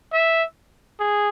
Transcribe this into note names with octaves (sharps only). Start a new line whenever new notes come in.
E5
G#4